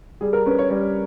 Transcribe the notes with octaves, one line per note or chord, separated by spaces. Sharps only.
G3 G#4
A#4
C#4 B4
C#5
G3 C#5